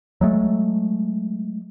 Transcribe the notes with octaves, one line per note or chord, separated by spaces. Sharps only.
F#3 G#3 A3